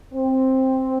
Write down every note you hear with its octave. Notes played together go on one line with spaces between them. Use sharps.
C4